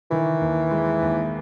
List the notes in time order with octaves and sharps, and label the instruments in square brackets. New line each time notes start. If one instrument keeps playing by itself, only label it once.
[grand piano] D#3 [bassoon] E3
[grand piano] D#2
G#3
D#2